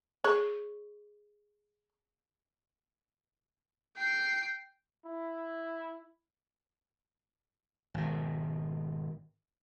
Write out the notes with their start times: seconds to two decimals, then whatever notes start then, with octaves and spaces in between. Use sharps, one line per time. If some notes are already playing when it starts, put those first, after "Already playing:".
0.24 G#4 C#5
3.97 G5 C7
5.05 E4
7.94 G#1 B2